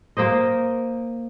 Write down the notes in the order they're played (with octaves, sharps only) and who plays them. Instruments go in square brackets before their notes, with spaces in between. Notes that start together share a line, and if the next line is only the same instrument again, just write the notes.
[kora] A#3 A#4 C5 D#5